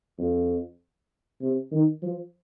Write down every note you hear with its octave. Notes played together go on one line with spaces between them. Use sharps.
F2
C3
D#3
F3